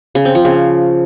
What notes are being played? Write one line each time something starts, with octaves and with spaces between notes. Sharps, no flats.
C#3
C4
F3
C#3